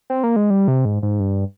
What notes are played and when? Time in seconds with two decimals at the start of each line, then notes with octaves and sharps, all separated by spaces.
0.10 C4
0.23 A#3
0.36 G#3
0.50 G3
0.68 C3
0.85 G#2
1.03 G#2
1.20 G2